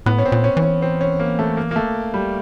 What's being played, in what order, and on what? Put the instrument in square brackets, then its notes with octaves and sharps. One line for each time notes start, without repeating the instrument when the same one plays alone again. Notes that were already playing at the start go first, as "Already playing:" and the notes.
[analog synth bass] A2 [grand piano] B3
[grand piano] C#4
C4
[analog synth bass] A#2
[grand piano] C#4
[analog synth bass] E3
[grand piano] C#4
C4
C#4
A#3
A3
A#3
A#3
A3
G3